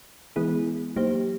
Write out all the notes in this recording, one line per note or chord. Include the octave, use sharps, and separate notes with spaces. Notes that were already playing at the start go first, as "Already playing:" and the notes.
E3 G#3 B3 E4 G#4
F#3 A#3 D#4 G4 C5